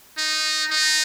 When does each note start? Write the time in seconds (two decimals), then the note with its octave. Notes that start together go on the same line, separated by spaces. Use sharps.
0.18 D#4
0.70 D#4